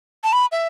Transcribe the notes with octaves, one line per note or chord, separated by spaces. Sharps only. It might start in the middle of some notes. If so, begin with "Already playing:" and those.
A5
B5
E5